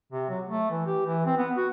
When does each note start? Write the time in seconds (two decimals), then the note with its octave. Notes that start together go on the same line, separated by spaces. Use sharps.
0.12 C3
0.30 F#3
0.48 A3
0.71 E3
0.86 G4
1.06 E3
1.26 C4
1.37 B3
1.56 F#4